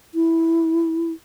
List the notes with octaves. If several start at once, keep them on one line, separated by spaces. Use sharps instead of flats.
E4